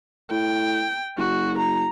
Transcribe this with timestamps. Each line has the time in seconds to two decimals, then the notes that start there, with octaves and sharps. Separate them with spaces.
0.31 A2 G5
1.18 F#1 F#4
1.58 A#5